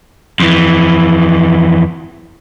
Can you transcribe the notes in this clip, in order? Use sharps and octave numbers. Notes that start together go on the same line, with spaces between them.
F2 E3